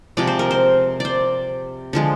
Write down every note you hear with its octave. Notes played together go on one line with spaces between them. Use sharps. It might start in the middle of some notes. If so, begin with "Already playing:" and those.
C3 F3 G#3 D5
C5
A#4
C5
C5 D5
D3 F3 G#3